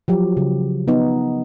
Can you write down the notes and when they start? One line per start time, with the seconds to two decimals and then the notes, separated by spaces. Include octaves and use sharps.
0.08 F3 F#3 G4
0.37 C#3
0.88 B3 D#4